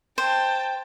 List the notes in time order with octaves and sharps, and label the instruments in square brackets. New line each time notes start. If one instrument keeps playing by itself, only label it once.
[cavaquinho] C5 [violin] G5 A5